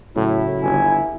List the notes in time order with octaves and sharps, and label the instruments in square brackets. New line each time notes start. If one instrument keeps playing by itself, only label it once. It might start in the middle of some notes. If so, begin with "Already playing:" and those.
[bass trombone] A2 [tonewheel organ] C#3 F#3 [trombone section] E4
[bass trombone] G1 [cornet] G#5